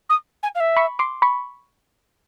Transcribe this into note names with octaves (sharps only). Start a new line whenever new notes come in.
D#6
G#5
F5
E5
B5 C#6
C6 D6
B5 C#6